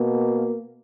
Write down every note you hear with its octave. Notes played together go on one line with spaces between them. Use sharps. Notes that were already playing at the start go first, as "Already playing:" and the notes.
Already playing: B2 A#3